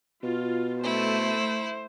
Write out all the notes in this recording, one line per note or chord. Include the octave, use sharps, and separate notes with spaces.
B2 F4
A3 E4 C5